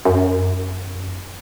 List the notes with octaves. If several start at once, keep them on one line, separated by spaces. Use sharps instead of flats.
F#2